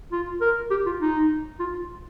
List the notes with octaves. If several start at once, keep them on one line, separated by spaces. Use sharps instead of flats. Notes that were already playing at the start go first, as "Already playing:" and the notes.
F4
A#4
G4
F4
D#4
F4